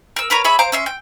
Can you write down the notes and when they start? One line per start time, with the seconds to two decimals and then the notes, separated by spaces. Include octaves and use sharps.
0.16 A#4 E6
0.30 A#4 B4 C#5 A#5
0.44 G#4 C#5 E5 B5
0.59 C5 F5 A#5 D6
0.72 C#4 E5 C6
0.86 G5